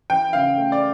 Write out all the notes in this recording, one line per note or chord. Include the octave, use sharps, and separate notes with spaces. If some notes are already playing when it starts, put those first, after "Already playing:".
E3 G5
C#3 F5
A3
D5